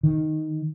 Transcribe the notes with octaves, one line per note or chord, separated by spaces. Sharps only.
D#3